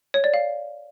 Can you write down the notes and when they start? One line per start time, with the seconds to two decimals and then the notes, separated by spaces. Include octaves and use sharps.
0.14 C#5
0.24 D5
0.34 F5